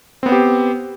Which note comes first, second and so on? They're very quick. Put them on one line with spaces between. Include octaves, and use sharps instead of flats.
C4 B3 C5 G4